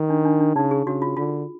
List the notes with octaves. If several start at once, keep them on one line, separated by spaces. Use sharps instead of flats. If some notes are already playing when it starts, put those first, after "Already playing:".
Already playing: D#3
D4
D4
D4
C#3 D#4
G#4
C#3 F#4
F4
D3 F4